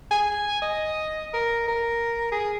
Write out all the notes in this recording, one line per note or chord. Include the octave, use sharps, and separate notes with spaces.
G#5
D#5
A#4
A#4
G#4